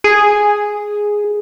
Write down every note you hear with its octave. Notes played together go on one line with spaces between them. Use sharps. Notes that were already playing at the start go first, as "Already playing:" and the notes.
G#4